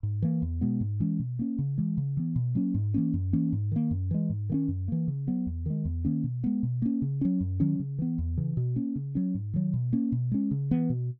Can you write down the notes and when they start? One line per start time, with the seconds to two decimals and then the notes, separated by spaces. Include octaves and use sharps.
0.03 G#2
0.22 E3 A#3
0.42 E2
0.61 B2 G#3 B3
0.81 G#2
1.00 E3 G#3 C#4
1.19 B2
1.39 A#3 C#4
1.59 C#3
1.78 E3 G#3
1.97 C#3
2.17 E3 B3
2.36 B2
2.55 F#3 A#3 C#4
2.74 G#2
2.94 E3 A#3 C#4
3.14 F#2
3.33 E3 A#3 C#4
3.53 G#2
3.72 D#3 A#3
3.91 F#2
4.11 E3 G#3
4.30 G#2
4.50 D#3 A#3 C#4
4.68 F#2
4.88 E3 A#3
5.08 C#3
5.27 F#3 B3
5.46 E2
5.66 D#3 G#3
5.85 E2
6.05 D#3 A#3 C#4
6.24 B2
6.44 G#3 B3
6.63 B2
6.82 A#3 C#4
7.02 C#3
7.21 F#3 C#4
7.40 F#2
7.60 D#3 F#3 C#4
7.80 C#3
7.99 E3 B3
8.18 E2
8.37 C#3 E3
8.57 B2
8.76 A#3 C#4
8.95 C#3
9.15 F#3 C#4
9.35 G#2
9.54 D#3 F#3
9.74 B2
9.93 A#3 C#4
10.12 B2
10.32 G#3 C#4
10.51 C#3
10.71 E3 B3
10.90 B2